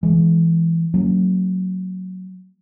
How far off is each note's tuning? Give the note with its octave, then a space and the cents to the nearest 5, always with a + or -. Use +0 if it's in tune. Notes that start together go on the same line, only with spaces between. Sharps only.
E3 +15 G#3 +15
F#3 +0 A#3 -30 C#4 +0